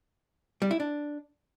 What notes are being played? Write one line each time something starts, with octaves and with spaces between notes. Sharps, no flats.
G3
E4
D4